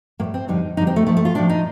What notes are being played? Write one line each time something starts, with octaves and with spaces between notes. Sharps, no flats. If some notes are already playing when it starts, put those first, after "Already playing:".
A2 G3 A#3
C4
F2 D3 G3 D#4
F2 D3 G3 D#4
C4
A3
A2 F3 A3
A3
F4
A2 F3 D4
D#4